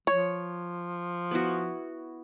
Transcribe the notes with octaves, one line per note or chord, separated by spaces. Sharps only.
F3 C#5
B3 E4 F#4